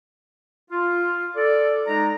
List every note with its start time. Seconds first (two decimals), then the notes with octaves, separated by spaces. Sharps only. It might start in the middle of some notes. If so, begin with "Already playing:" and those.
0.70 F4
1.36 A4 D5
1.88 G#3 D#4 A#5